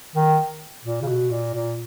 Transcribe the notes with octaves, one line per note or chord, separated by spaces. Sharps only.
D#3
A#2
C#3
B2
A#2
A#2